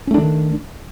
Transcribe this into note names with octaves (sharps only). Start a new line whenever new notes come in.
D#3 A3 C#4 D4